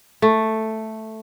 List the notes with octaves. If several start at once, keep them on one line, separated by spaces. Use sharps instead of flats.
A3